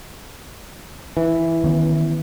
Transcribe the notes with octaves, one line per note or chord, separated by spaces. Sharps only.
E3
D#3 B3 C#4